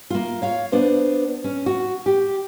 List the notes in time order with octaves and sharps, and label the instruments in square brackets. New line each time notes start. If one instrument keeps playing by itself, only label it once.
[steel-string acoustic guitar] A#3 F4
C#5 F5
B3 D4 C5
C#4
F#4
G4